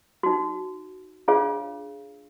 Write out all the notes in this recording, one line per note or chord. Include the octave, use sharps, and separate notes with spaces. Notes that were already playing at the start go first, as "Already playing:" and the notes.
D#4 F#4
D4 F4 G#4 C#5 F5